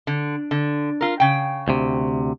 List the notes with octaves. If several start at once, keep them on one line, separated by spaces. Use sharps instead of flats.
D3
D3
F4 A#4
C#3 G5
D2 C3